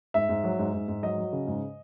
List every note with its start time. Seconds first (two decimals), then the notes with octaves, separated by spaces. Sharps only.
0.14 G#2 E5
0.29 G#2
0.44 F#3
0.59 G#2
0.74 G#2
0.88 G#2
1.03 F#3 D#5
1.18 F#3
1.33 C#3
1.47 G#2